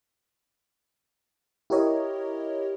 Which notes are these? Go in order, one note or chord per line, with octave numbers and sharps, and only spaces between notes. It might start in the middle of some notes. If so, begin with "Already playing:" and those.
E4 G4 A#4 C#5 D#5